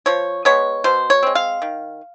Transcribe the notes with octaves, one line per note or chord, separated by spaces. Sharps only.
F3 C#5
G#3 B3 C#5
B2 C5
C#5
G#3 C4
F5
D#3